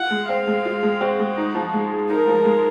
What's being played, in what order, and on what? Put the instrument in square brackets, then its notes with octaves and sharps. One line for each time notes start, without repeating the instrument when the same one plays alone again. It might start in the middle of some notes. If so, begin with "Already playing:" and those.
Already playing: [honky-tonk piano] F4 [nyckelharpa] F#5
[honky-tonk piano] G#3
[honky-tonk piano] C4 [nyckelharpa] F5
[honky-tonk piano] G#3
F4
G#3
[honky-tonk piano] C4 [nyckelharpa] F#4
[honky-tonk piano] G#3
D#4
F3
G#3
G#4
[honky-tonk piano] D#4 [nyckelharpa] A#4
[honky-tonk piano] F3
G#3